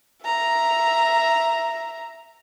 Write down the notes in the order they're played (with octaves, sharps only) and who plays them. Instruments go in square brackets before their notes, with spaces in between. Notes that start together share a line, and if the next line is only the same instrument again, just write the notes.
[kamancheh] E5 A#5